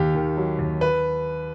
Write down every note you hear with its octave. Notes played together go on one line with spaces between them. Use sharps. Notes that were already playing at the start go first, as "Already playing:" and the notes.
Already playing: D#2 G4
D#3
F#3
D#2
B4